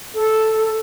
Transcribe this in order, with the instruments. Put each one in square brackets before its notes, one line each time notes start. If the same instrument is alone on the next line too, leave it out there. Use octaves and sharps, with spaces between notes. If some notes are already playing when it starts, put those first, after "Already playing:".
[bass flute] A4